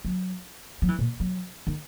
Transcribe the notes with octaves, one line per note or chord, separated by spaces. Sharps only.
F#3
F#3
E3
A#2
F#3
D#3